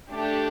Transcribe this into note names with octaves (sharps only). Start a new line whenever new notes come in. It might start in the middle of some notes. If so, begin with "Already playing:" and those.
A3 D4 G4